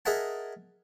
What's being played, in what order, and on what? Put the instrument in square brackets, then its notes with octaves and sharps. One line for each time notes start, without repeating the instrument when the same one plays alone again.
[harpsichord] G#4 A#4 D#5 E5 F#5 A5